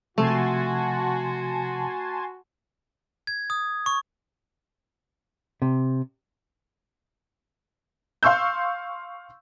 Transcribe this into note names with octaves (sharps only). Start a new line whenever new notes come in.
C3 F3 A3 F#4 G#5 A5 C6
G#6
D#6
C#6
C3
F5 C6 C#6 E6 G6